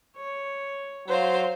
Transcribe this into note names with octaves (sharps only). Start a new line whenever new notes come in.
C#5
F#3 C5 F5